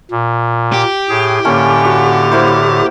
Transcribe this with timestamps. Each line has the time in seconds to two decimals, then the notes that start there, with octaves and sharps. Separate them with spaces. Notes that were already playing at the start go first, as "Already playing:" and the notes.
0.11 A#2
0.73 G4
1.09 A2 G#4
1.45 A2 D3 A#3 C#4 A5
1.85 F#4
2.31 A#3 E4 C5